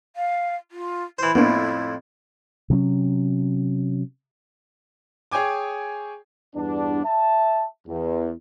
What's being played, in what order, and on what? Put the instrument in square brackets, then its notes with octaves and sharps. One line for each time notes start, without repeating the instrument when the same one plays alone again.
[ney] F5
F4
[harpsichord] E3 C5 [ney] E4
[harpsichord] F2 A2 [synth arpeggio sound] A#3 B3 D4
[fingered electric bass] C3 F#3 C4 C#4
[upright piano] G#4 C#5 G5 G#5 D6
[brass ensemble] E2 G2 B3 D4
E5 A5
E2